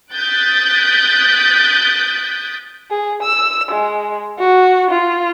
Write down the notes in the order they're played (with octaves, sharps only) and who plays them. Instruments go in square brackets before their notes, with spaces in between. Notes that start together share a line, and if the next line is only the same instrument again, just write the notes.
[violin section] D#6 F#6 G6 A6 B6 D7
[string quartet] G#4
E6
G#3
F#4
F4